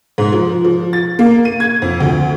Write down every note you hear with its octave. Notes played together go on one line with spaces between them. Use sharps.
G#2
F3
F3
A6
A#3
D#7
G#6
F2
D2